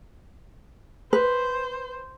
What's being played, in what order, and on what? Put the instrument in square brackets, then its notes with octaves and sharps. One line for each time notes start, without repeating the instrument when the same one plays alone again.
[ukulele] B4 [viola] C5